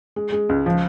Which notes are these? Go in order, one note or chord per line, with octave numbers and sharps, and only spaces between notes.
G#3
G#3
C#2
F3